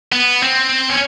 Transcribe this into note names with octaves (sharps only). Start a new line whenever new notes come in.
B3
C4
C#4